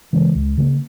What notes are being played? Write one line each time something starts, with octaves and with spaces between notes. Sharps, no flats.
C#3 E3 G#3
C#2
C#3 G3 A#3